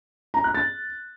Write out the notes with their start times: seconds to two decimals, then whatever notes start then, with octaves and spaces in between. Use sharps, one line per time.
0.34 A#5
0.44 F#6
0.54 A6